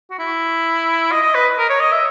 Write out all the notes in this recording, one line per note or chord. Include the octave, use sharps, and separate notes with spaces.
F#4
E4
D#5
D#5
B4
A#4
C#5
D#5
E5